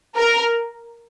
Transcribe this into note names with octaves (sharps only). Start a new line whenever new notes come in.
A#4